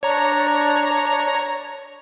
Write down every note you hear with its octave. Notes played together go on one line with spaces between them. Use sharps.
D4 C#5 A#5